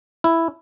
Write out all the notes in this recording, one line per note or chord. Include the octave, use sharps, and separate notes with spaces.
E4